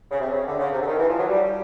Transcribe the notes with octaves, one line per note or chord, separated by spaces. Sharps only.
C#3
C3
C#3
D3
C#3
C3
D3
D#3
E3
F3
F#3
G3